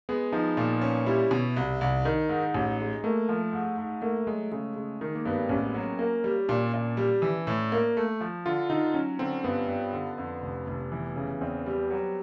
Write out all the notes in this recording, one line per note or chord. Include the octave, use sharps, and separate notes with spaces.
G#3 B3
F3 D#4
A#2
C#4
G3 E4
B2
C2
C2
D#3 D#4
G#2
A1
G#3
A3 A#3
F3
G#2
G#2
A3 A#3
F#3 G#3
C#3 G#3
C#3
D#3
A#3
G2 B3
C4
A1 C#4
F#3
A#3
G3
A#2 D4
A#2
G3
E3
A2
A#3
A3
F3
D3 F4
D3 D#4
F#3 C#4
D3 C4
G2 B3
G2
D3
F2
F1
F1
E3
C#3
E2 C4
G3
F#3